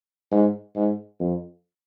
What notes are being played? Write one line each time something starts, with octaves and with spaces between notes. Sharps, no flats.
G#2
G#2
F2